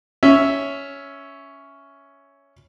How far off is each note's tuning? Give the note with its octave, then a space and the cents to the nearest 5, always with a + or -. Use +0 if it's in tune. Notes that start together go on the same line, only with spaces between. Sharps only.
C#4 +10 E5 +0